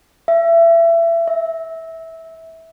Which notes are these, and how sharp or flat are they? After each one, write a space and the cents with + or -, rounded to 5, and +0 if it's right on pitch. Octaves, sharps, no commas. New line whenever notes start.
E5 +25
E5 -15